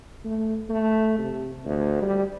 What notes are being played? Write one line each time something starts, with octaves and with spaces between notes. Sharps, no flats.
A3
A3
C3
D2
G3